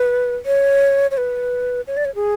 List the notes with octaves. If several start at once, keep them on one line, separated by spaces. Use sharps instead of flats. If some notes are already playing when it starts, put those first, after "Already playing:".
Already playing: B4
C#5
C#5
B4
C#5
D5
C#5
G#4